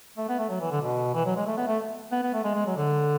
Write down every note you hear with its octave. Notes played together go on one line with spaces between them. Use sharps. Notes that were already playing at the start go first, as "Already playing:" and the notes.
A3
B3
A3
F#3
E3
D3
B2
E3
F#3
G#3
A3
B3
A3
B3
B3
A3
G#3
G#3
F#3
D3